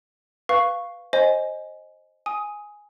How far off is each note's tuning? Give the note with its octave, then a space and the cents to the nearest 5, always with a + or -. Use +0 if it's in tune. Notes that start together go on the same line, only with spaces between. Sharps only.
B4 +0 F5 +0 C#6 +0
C5 +15 D#5 -5 G#5 +10
G#5 +0 D#6 +15